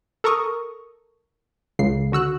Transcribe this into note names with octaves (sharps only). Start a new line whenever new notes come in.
A4 A#4 A#5 C#6 D#6
C#2 C#3 C7
D3 F#4 E6 F#6